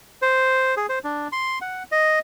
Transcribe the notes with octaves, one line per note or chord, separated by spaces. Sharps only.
C5
G#4
C5
D4
C6
F#5
D#5